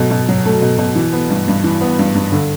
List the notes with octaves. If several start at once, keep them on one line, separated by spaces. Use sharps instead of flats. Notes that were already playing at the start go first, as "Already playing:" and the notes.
Already playing: B2 F#3 A3
B2
F#3
A3
B2
B2
E3
B3
G2
G2
E3
B3
G2
G2
D3